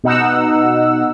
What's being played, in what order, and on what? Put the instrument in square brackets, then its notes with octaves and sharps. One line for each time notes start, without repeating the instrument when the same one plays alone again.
[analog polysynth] B2 D#4 F#5 E6